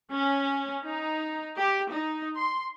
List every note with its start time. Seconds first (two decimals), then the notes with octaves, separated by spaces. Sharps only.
0.12 C#4
0.84 D#4
1.58 G4
1.92 D#4
2.36 C6